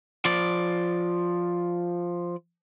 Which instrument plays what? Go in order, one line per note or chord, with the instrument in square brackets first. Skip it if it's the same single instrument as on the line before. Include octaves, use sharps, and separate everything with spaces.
[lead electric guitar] F3 D5